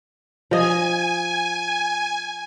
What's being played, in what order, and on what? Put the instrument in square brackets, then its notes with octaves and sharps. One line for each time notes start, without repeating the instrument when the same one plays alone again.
[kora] F3 D#5 [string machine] G#5